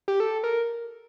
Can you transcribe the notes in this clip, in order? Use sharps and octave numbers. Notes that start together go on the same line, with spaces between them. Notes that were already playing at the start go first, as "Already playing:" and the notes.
G4
A4
A#4